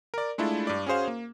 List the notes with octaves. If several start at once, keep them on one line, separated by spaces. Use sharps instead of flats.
A#4 D5
G#3 A3 D4 E4 F4 A4
G2 D5
C#4 F#4 G#4 C5 F5
A#3